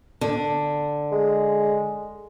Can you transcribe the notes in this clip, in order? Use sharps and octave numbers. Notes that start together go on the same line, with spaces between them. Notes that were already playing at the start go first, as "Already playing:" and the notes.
D3
G#3